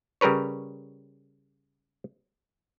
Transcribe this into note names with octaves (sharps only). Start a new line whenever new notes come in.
C#3 G3 A#4 B4 C#5